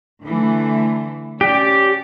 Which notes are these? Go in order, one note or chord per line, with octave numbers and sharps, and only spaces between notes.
D3 E3 A3
C#4 G4 D5